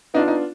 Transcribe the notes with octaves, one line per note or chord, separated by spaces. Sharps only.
B3 D4 D#4 F4
D#4